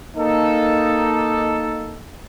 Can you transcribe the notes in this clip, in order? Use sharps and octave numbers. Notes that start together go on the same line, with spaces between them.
A#3 D#4 A4